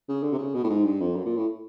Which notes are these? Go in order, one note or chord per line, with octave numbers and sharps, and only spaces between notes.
C#3
D3
C3
C#3
B2
A2
G#2
G2
F2
F#2
A#2
A2